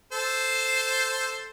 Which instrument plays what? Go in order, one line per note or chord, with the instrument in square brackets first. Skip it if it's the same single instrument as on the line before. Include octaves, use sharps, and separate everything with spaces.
[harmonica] A4 C5